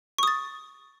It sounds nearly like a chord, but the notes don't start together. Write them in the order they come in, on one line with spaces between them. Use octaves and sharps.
C#6 D#6 A6